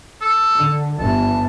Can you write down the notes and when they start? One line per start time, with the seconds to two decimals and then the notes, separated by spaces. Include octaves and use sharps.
0.21 A4
0.57 D3
0.99 G1 E3 A5